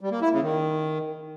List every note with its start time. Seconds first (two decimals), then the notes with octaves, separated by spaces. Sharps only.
0.01 G3
0.11 A#3
0.22 E4
0.32 C#3
0.43 D#3